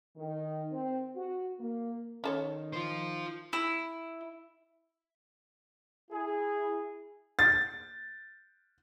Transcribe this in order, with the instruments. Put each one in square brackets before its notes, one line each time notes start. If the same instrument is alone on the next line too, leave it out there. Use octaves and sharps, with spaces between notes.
[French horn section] D#3
C4
F#4
A#3
[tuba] D#3 [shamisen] C#4 A4 C#5
[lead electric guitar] F4 C5
[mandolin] E4
[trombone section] E4 G#4
[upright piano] A6